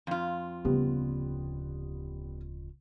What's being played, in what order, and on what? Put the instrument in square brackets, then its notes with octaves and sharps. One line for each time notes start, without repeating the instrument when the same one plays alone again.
[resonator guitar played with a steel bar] F2 F4
[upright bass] D1 C#3 [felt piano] G3 B3